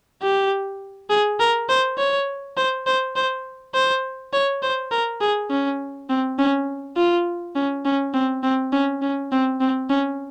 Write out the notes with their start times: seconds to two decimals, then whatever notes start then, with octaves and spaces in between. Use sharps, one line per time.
0.22 G4
1.10 G#4
1.40 A#4
1.69 C5
1.98 C#5
2.57 C5
2.87 C5
3.16 C5
3.74 C5
4.33 C#5
4.62 C5
4.91 A#4
5.21 G#4
5.50 C#4
6.09 C4
6.39 C#4
6.97 F4
7.56 C#4
7.85 C#4
8.14 C4
8.43 C4
8.73 C#4
9.02 C#4
9.32 C4
9.61 C4
9.90 C#4